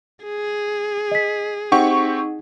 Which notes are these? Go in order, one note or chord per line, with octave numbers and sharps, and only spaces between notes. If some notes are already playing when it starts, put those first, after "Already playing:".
G#4
D#5 B6
C4 D#4 G4 F#5 C#6